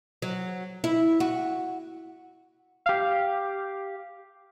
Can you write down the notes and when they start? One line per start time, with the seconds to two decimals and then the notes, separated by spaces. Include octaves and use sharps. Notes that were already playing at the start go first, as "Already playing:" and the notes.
0.22 F#3
0.84 E4
1.20 F#4
2.86 G4 F5